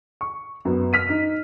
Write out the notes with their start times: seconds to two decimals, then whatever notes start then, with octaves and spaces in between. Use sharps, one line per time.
0.21 C#6
0.65 F#2 B3
0.93 F6 B6 D#7
1.09 D#4